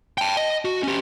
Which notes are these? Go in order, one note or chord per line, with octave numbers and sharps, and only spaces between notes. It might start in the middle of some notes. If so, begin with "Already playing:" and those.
G5 A5
D#5
F#4
C#4 G4